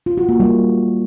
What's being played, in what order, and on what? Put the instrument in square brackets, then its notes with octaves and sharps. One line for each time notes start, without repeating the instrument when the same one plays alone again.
[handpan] F4
F#4
A#3
G3